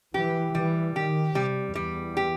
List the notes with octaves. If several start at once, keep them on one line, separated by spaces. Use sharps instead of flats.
E3 G4
E3 G3
D#3 G4
C3 G3
E2 G3
G4